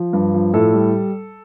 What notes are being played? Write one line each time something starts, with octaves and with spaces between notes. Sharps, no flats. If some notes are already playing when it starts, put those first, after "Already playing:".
Already playing: F3
G2
F3
A2 A4
G3